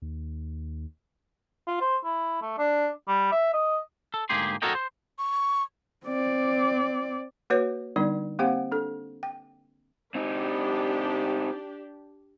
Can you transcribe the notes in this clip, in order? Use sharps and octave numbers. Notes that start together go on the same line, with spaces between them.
D#2
F4
C5
E4
A3
D4
G3
E5
D#5
A4
D2 G#2 A#3 G4 G#4 C6
F#4 A4 A#4 C#5 D#5 G5
C5
C#6
C4 D5
A#3 F#4 B4 C#5
D3 G3 B3 D4 D#4 D5
A#3 C4 G4 C5 F5 F#5
D4 A4
G5
C4 D4 D#4 G4